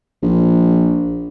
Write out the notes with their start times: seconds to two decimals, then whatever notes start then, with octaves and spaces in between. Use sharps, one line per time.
0.23 A#1